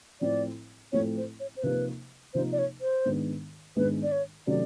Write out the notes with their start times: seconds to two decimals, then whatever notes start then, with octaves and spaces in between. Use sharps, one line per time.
0.21 A2 F3 A3 C4 E4 D5
0.92 A2 F3 A3 C4 E4 C#5
1.17 C5
1.40 C#5
1.56 C5
1.63 C3 F3 A#3 D#4 B4
2.34 C3 F3 A#3 D#4 C5
2.52 D5
2.58 C#5
2.81 C5
3.05 G#2 D#3 G#3 B3 D4
3.76 G#2 D#3 G#3 B3 D4 B4
4.03 D5
4.12 C#5
4.47 C3 D#3 F#3 A3 C#4 D5